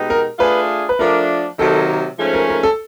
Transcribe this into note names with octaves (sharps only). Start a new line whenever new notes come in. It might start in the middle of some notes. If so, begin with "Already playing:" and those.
Already playing: B2 G#3 B3 D#4 G4
A#4
A3 D4 F4 G#4 B4
B4
F3 A3 D4 A#4
C3 D#3 F#3 A#3 D#4 A4
G#2 F3 A3 C#4
A#4
A#4
A4